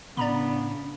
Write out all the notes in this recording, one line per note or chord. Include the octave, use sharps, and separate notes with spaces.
A2 C#3 B3 D4 D5 A#5 B5